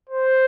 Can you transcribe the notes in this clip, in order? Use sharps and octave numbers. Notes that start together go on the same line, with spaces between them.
C5